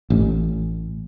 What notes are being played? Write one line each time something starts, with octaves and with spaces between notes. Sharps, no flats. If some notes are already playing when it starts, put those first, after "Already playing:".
A1